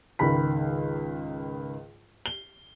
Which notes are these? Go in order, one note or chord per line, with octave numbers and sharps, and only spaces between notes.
C#2 G#2 D#3 B5 B6
G7